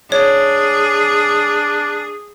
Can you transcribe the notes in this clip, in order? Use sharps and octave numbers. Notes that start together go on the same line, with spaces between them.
D4 G#4 C#5